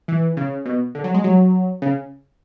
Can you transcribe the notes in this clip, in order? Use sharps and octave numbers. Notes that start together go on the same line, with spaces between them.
E3
C#3
B2
D3
F#3
G#3
F#3
C#3